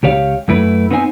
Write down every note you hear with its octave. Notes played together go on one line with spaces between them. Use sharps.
C#2 G4 C#5 F5
F#2 A3 E4 B4
B3 C4 D#4 C5 G5 G#5